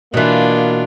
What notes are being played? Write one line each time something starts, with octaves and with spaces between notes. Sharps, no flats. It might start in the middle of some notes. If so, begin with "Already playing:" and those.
B2 E3 A#3 D4 F4